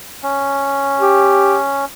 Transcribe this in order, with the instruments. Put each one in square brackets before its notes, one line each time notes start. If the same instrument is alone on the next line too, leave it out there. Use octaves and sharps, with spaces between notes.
[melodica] C#4
[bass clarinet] G4